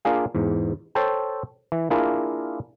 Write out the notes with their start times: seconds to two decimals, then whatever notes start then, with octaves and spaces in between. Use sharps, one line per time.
0.05 A#3 D4 F4 G#4 F5
0.35 E2 G#2
0.95 A4 C5 C#5 G5 A5
1.72 E3
1.90 A#3 D4 E4 F4 G#4 A#4